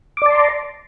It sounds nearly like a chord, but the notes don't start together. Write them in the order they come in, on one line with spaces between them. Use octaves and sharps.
D6 D5 A5 C6 A#5